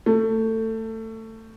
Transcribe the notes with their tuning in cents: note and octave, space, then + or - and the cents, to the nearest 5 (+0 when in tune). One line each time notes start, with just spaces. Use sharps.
A3 +20